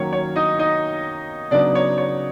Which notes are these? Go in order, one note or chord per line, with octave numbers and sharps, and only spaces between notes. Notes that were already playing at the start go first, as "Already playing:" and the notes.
Already playing: D#3 F#3 A#3 C#4 C#5
C#5
D#4 D#5
D#4 D#5
C#3 F#3 B3 D4 D#4 D5
C#5
C#5